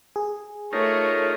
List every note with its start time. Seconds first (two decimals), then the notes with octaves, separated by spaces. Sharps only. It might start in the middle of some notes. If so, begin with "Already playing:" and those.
0.16 G#4
0.73 A3 D#4 F4 A#4 C#5